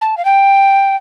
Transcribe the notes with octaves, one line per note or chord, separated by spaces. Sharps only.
A5
F5
G5